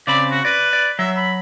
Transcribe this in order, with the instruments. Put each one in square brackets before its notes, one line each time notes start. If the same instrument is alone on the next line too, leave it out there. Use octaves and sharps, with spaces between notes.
[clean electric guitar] C#3 C4 B5 [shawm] D5
[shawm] F#4
[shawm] B4 [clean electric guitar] D5
[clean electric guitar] D5
[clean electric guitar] F#3 [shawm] E5
[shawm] B5